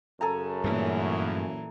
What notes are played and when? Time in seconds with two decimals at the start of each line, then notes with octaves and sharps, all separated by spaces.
0.21 F#2 C#3 A4 G#5 A#5
0.64 G2 A#2 E3 A3